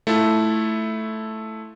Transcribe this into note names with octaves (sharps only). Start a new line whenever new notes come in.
A3 E4 F4 A4